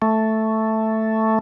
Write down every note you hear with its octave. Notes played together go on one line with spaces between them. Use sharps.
A3